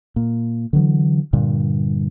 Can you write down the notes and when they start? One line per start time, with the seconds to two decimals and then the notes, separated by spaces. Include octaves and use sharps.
0.16 A#2
0.73 D3 E3 F#3
1.33 G2 A#2 D3